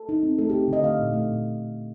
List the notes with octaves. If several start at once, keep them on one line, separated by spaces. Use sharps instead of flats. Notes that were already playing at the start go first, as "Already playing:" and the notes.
Already playing: A4
D#4
C4
A3 A4
C4 G4
D3 D#5
A3 F5
A#2
A3
A#2